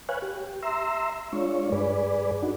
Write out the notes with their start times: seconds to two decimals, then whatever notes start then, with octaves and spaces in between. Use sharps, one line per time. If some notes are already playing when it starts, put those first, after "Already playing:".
0.09 B4 C#5 F5 G#5 F#6
0.22 G4
0.63 E5 A#5 C6 E6
1.33 G#3 D4 F4 C#5
1.72 G2 G#4 B4 D5
2.43 D4 D#4 F#4